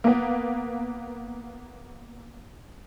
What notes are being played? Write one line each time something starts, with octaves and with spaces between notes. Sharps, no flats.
A#3 B3